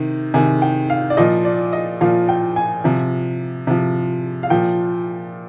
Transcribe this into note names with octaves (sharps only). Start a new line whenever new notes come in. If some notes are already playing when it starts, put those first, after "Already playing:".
Already playing: C3 D#3
C3 D#3 G#5
G5
F5
D5
A#2 F3 D#5
D5
D#5
A#2 F3 F5
G5
G#5
C3 F3
C3 F3
F5
A#2 F3 G5